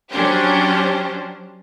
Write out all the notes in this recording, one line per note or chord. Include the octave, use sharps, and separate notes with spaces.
F#3 C#4 D4 G4 C5